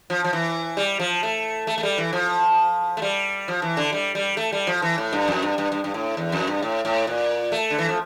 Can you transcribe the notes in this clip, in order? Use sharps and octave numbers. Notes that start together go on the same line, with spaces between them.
F3
F3
E3
G3
F3
A3
A3
A3
G3
E3
F3
A3
G3
F3
E3
D3
G3
G3
A3
G3
F3
E3
A2
G2
F2
G2
G2
G2
G2
A2
E2
F2
G2
A2
A2
A#2
A3
D3
E3
F3